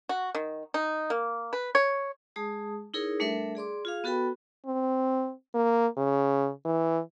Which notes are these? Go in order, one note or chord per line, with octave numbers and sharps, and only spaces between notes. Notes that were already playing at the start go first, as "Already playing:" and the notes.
F#4
D#3
D#4
A#3
B4
C#5
G#3 G#4 A5 D#6
D#4 E4 G#4 A#4 C#5
G3 A3 D4 A4 A#4 E5
G#4 D5 C6 D6
F4 G#4 F5
B3 F#4 A4 B4 G5 B5
C4
A#3
C#3
E3